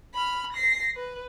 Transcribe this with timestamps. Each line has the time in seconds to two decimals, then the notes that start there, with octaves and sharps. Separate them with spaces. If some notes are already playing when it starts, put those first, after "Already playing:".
0.14 B5 F6
0.53 A#6 C7
0.96 B4